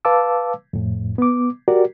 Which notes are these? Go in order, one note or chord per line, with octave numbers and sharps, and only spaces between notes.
B4 F5 A5 D6 E6
F2 A2
B3 D6
F#4 G4 A#4 D5